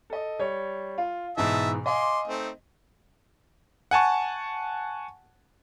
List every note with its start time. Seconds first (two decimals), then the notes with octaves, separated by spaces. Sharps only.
0.10 A4 D#5
0.39 G3 C#5
0.98 F4
1.37 G#2 B2 E3 D#5 E5 A5
1.86 D#5 F5 G#5 C6 D6
2.28 A3 C4 D#4
3.91 F#5 G#5 A5 C#6